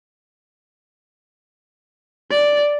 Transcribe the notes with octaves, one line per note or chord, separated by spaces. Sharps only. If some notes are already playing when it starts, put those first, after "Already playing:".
D5